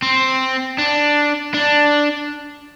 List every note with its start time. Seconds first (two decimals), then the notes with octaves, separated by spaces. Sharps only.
0.02 C4
0.78 D4
1.54 D4